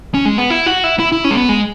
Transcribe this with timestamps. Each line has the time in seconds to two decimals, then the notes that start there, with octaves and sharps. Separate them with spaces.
0.14 C#4
0.25 G#3
0.38 B3
0.50 E4
0.66 F#4
0.84 E4
0.99 E4
1.12 E4
1.24 C#4
1.31 G#3
1.37 B3
1.49 G#3